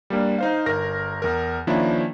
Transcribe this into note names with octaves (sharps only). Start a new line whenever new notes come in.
G3 A#3 D4
D#4 C5 F5
G1 A#4 A#6
E2 A#4
D#3 F3 A#3 C#4 D4 E4